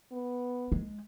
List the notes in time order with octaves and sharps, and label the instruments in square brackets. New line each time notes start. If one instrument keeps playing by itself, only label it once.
[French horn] B3
[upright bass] G#3